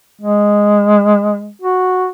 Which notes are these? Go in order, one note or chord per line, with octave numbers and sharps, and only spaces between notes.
G#3
F#4